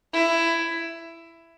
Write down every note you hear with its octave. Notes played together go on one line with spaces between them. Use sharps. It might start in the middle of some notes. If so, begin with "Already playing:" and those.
E4